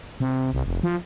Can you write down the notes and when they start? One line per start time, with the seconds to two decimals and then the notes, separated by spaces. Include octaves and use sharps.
0.20 C3
0.53 C2
0.66 F1
0.83 F3